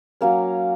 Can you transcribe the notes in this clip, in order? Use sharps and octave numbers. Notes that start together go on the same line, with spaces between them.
F#3 A#3 C#4